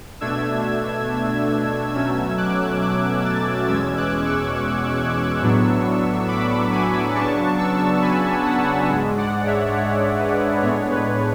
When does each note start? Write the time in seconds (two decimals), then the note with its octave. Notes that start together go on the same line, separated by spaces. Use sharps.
0.21 B2 A3 D4 E6 G#6
1.94 B2 F#3 A3 C#4 E6 G#6
2.38 D6 F#6
2.81 D6 F#6
3.24 F#6 A6
3.68 E2 B2 G#3 C#4 E6 G#6
3.97 D6 F#6
4.26 C#6 E6
5.42 A2 F#3 B3 D4
6.28 B5 D6
6.72 G#5 B5
7.15 C#3 F#3 B3 D4 A5 C#6
7.58 C#6 E6
8.02 G#5 B5
8.46 F#5 A5
8.89 G#2 G#3 D4
9.18 D5 F#5
9.46 C#5 E5
9.76 C#5
10.19 B4
10.62 A2 G#3 B3 D4 C#5
10.91 B4